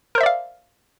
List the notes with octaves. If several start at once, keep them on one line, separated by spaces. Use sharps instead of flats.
A#4 C5 D5 E5 F5